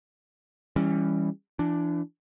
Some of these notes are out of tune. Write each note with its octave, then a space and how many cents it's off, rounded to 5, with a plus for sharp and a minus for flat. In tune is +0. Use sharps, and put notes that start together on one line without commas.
E3 +0 G3 +25 C#4 +0
E3 +40 D4 +0